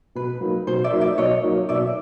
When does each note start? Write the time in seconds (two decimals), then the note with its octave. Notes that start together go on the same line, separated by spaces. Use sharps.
0.15 B2 B4
0.41 F#3 A#3 D#4
0.67 B2 C5
0.84 D5 E5
0.92 F#3 A#3 D#4
1.01 D5 E5
1.18 B2 C#5 D#5
1.43 F#3 A#3 D#4
1.69 B2 D5 E5